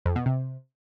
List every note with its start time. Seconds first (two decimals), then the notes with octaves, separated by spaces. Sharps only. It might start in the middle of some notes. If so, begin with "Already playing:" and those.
0.06 F2
0.16 B2
0.26 C3